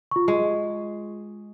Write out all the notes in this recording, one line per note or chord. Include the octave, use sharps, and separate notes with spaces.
F4 C#6
G#3